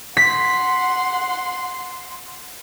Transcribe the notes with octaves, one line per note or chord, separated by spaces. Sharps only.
F#5 C6 B6